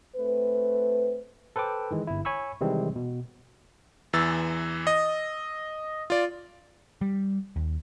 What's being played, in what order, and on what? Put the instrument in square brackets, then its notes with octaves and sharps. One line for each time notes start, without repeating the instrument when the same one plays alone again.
[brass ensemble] A3 C4 B4
[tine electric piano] A4 B4 C5 G5 D6
D#3 E3 G#3
G1 E4
C#5 G#5 B5 C#6 E6
C3 D#3 E3 G3 G#3 C4
B2
[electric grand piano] E2 E3 E6 A6
D#5
F4 D5
[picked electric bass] G3
D#2